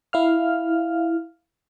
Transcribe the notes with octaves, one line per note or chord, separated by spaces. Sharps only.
E4 F5 F6